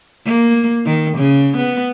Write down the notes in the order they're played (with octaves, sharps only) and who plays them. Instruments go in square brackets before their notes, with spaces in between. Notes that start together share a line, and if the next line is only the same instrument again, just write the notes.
[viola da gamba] A#3
D#3
C#3
B3